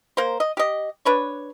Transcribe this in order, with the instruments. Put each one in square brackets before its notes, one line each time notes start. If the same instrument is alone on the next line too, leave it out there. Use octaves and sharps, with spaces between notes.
[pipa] A#3 A#4 C5
D#5
G4 D#5
D4 B4 C#5